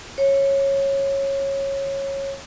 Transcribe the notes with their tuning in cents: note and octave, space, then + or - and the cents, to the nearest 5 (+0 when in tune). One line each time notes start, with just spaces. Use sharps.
C#5 -15